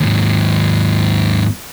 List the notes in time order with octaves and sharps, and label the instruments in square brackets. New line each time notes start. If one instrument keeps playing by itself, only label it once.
[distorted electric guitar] D#2 G#2